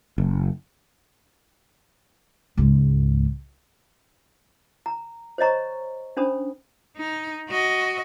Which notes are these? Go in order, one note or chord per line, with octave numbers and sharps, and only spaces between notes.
F#1
C#2 G#2
A#5
C5 C#5 D#5 A#5 C#6
C#4 D4 C5 B5 D#6
D#4
F#4 D#5